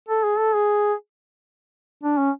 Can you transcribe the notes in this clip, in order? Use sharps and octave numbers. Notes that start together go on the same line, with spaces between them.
A4
G#4
A4
G#4
D4
C#4